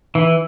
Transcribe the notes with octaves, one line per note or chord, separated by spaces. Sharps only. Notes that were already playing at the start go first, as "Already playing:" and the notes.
E3